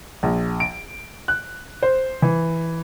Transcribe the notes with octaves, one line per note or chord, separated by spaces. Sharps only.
A#1
D7
F#6
C5
E3